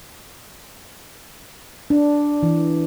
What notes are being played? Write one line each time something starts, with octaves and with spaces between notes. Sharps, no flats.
D4
E3